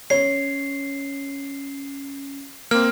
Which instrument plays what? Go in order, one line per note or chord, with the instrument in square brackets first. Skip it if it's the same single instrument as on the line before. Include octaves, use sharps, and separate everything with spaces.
[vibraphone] C#4 [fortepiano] C#5 [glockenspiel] C7
[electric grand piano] A#3 C4 [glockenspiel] F6